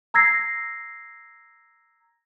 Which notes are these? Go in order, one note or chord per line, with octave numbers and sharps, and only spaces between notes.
A#5 E6 G#6 A#6 C7